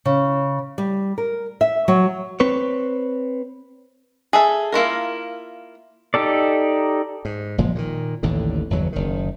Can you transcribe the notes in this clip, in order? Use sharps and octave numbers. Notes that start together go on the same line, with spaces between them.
C#3
G3
A#4
E5
F#3
C4 B4 C#5
G#4 A4 E5
A#3 E4 F4 A#4
D#4 G4 A4 D5
G#2
F#1 A#2 F3 G#3
A#2 D3 D#3
A1 D#2 A2 D3
G1 E2 F#3
F#1 D#3